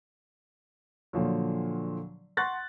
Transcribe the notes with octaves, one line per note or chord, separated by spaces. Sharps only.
A#2 D3 F3 F#3
F#5 C6 C#6 F#6 A6 A#6